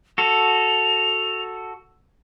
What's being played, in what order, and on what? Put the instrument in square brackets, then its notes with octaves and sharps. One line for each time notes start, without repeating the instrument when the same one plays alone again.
[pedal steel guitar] F#4 A4 [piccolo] F7